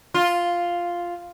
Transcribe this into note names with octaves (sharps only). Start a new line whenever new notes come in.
F4